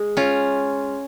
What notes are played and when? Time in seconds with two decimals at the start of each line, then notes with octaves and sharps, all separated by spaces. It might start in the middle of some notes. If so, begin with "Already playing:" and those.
Already playing: G#3
0.17 C#4 F4